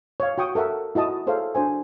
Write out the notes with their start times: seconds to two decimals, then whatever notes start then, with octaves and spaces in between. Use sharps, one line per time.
0.20 C#5 F5
0.38 F#4 G5 C#6 D#6
0.55 A4 A#4 E5 F#5
0.95 E4 F#4 D#5 A5 D#6
1.27 G#4 A4 C5 C#5 E5 F5
1.55 D4 F#4 C5 G#5